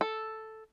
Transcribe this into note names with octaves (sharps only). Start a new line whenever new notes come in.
A4